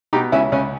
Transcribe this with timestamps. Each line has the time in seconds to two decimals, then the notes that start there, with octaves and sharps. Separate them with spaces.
0.13 B2 D#4 G4
0.32 C#2 C#4 E4
0.52 C#2 C#4